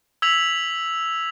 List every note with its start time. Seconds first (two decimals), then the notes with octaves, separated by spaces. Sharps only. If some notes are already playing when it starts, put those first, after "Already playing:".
0.22 E6 G#6 B6 F7 F#7